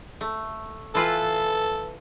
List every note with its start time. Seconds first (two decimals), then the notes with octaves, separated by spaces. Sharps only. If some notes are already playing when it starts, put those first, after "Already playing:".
0.21 A3
0.95 E3 F4 A4 B4